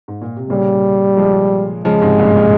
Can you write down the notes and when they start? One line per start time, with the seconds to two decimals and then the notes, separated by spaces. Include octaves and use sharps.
0.08 G#2
0.21 A#2
0.36 C3
0.50 A#2 C#3 G3
1.17 F3 G#3
1.85 C#3 F3 G#3
2.02 G#2 C3
2.18 G2 A#2
2.36 A#2